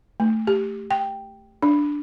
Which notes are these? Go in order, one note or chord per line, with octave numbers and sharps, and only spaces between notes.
A3
G4
G5
D4